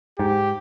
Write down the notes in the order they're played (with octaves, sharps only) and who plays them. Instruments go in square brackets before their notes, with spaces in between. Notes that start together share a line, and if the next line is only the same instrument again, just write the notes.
[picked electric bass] G#2 [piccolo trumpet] G4